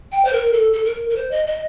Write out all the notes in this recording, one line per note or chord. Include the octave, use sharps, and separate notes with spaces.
G5
C5
A#4
A4
A4
A#4
A#4
C5
D#5
D#5